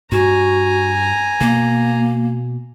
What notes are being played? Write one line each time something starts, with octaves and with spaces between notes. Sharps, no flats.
G2 F#4 G#5 A#5
B2 A#3